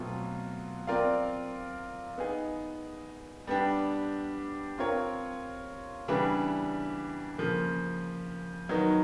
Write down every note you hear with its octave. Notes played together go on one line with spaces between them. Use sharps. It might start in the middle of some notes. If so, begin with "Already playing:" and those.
Already playing: B2 F#3 A3 C4 F4
C4 F4 A#4 D5 F5
B3 D#4 G#4
G3 B3 D4 G4
C4 F4 A#4 C#5
C#3 E3 G3 B3 D4
C#3 F3 A#3
D#3 F#3 B3 D#4